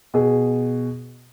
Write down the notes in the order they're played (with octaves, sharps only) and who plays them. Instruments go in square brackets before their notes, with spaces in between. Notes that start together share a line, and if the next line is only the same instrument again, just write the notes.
[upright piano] B2 G#4